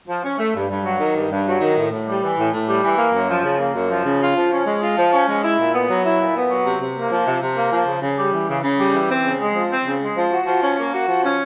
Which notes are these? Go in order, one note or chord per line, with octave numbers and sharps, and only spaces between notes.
F3
C#4
A3
G2
G2
F#3
D#3
G2
G2
F#3
D#3
A2
A2
G3
E3
A2
A2
G3
E3
A#3
F#2
F3
C#3
A#3
F#2
F3
C#3
F4
F3
C#4
G#3
F4
F3
C#4
G#3
E4
A#2
B3
F#3
E4
A#2
B3
F#3
C3
C3
A#3
F3
C3
C3
A#3
F3
C#3
C#3
G3
E3
C#3
C#3
G3
E3
C4
C#3
G#3
F3
C4
C#3
G#3
F3
F#4
F3
C#4
A#3
F#4
F3
C#4